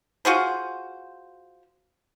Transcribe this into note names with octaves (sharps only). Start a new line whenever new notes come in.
F4 F#4 G#4 C5